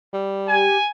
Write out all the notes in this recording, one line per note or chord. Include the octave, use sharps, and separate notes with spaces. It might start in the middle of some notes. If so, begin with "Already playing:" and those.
G3
G4 G#5